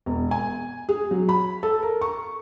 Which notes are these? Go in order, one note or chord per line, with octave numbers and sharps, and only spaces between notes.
E1
G#5
G#4
F#3
B5
A4
A#4
C#6